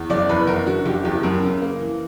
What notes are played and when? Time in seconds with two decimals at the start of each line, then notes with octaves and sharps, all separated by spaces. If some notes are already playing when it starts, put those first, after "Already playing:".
Already playing: E2
0.10 F#1 D5
0.29 E2 B4
0.47 F#1 A#4
0.66 D3 F#4
0.85 F#1 G4
1.05 E2 G4
1.23 F#2 A#4
1.43 C#3
1.62 A#3
1.81 E3